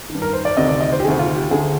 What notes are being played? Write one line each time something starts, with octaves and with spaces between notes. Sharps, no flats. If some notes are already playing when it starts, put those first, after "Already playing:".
D#3
G2
A#4
C5
D5
D2 C3 D#3 D#5
D5
D#5
C5
G4
D2 C3 D#3 G#4
F4
G4
D2 D3 G#4